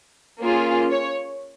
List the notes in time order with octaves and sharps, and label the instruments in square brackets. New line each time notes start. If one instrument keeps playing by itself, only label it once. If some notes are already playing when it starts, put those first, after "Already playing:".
[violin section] A#3 C#4 F4 G#4
C#5